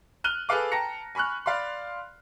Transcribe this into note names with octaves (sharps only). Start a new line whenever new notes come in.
F6 F#6 D#7 G7
G#4 A4 B4 F5 D6
G5 A5 A#5 A#6 C#7
G#5 B5 C#6 F6 F#6
D5 F5 B5 C6